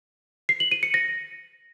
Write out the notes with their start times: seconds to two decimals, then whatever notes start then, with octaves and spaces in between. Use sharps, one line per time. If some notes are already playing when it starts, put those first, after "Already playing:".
0.49 C7
0.60 F#7
0.71 D#7
0.83 C#7
0.94 A#6